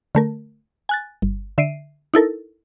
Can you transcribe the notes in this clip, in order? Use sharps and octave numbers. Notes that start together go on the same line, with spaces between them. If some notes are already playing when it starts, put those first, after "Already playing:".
D3 A3 A#4
G#5 F#6 A6
G1
D3 E5 C7 D7 D#7
D#4 E4 A4 A#4